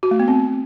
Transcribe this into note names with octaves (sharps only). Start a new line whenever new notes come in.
F#4
A3
B3
C4